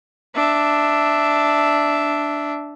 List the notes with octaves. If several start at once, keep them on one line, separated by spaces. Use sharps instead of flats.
D4 E5